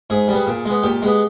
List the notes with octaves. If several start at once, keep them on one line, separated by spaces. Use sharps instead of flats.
G#2 G#4
G3 B3
A#2
G#3 B3
A#2 G4
G#3 B3